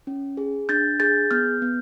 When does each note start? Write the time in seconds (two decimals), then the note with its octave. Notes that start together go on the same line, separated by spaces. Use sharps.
0.07 C#4
0.37 G#4
0.69 D4 G6 A6
1.00 G#4 G6 A6
1.31 B3 F6 G6
1.62 B3